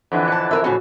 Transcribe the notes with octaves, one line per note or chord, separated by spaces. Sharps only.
F2 D3 E3
F#5 A5
A#4 B4 E5
A2 C#3 F#4